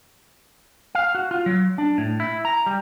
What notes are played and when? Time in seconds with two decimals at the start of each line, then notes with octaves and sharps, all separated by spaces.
0.95 F5
1.15 F#4
1.31 F4
1.46 F#3
1.78 D4
1.98 A2
2.20 E4
2.45 A#5
2.66 G3